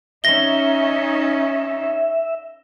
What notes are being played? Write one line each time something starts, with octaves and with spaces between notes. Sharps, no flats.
C#4 D#4 E5 A#6 G7